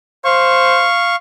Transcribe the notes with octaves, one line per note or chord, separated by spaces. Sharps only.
C5 F5 C#6